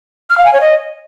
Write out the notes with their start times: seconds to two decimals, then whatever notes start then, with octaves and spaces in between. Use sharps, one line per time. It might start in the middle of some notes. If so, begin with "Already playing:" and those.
0.30 F6
0.38 F5
0.45 G#5
0.53 C#5
0.61 D#5